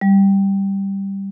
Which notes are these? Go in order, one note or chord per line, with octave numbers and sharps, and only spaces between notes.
G3